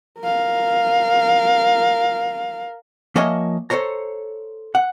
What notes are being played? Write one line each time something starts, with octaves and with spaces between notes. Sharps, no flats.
A#4 F5
F3 A#3 C#5 D#5 E5 G#5
A4 A#4 C5 C#5 A#5
F#5